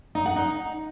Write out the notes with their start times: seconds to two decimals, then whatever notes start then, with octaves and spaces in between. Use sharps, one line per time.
0.15 D#4
0.26 F#5
0.36 D#4